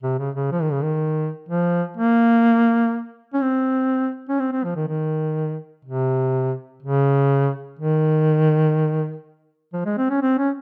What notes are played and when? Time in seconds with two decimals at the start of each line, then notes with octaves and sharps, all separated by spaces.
0.03 C3
0.19 C#3
0.35 C#3
0.52 F3
0.62 D#3
0.72 C#3
0.82 D#3
1.49 F3
1.97 A#3
3.34 C#4
3.42 C4
4.29 C#4
4.40 C4
4.52 C4
4.64 F3
4.76 D#3
4.88 D#3
5.85 C3
6.83 C#3
7.79 D#3
9.73 F3
9.85 G#3
9.98 C4
10.10 C#4
10.22 C4
10.38 C#4